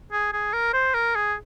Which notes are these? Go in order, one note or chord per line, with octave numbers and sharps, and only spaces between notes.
G#4
G#4
A#4
C5
A#4
G#4